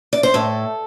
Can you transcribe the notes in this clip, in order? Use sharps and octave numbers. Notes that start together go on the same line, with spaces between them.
D5
C5
A2 A4